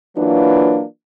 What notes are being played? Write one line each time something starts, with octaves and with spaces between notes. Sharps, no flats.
E3 F#3 A#3 D4 F4 B4